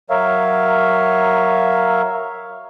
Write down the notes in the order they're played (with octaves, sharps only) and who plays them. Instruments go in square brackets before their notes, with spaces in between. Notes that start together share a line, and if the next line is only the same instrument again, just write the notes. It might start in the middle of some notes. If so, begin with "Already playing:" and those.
[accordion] F#3 A#4 C#5 E5 F5